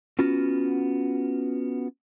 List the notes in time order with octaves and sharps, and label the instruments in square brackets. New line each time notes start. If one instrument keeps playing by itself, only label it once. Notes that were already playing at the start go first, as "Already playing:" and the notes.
[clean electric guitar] B3 C#4 F4 F#4